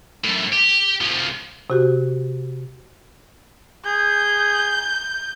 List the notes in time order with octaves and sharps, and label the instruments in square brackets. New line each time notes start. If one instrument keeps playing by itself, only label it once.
[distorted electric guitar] F#2 A2
G4
C2 F3
[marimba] C3 F#4 G4
[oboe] G#4 [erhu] G6